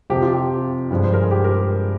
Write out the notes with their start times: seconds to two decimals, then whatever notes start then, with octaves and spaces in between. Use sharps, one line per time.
0.10 F2 C3 F3 G4
0.22 F4
0.34 G4
0.91 G2 F3 G#3
1.04 C5
1.14 A#4
1.22 G#4
1.31 G4
1.44 A#4